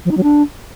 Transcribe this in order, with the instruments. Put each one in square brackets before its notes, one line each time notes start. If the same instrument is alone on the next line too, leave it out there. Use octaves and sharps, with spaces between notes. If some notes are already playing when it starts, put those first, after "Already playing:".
[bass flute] F3
D#4
F#3
D4